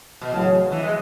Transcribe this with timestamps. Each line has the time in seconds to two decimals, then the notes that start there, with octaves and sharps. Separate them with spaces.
0.21 B2
0.32 A1 A2 C#3 F#3
0.72 E3
0.83 G#3